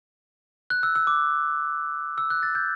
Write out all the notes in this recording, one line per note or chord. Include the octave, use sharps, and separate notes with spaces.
F#6
E6
E6
D6
E6
F#6
A6
G6